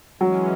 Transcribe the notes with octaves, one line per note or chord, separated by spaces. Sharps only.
E3 F#3 G#3 C#4